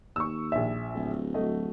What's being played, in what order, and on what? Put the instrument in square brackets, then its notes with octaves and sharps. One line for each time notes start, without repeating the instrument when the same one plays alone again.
[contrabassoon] D#2 [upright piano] C#6 E6
[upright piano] A#1 E5
[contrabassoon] D1
[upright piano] F#3 A3 D#5